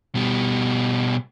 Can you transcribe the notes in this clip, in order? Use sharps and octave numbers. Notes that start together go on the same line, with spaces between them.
B2 G3